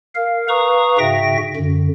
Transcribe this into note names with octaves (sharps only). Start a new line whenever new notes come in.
A#4 F5
B4 F5 A#5 C#6 D#6
G#2 C#3 F#4 E5 G5 A#6
F#2 D3